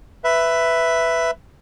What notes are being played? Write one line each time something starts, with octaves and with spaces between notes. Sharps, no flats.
B4 E5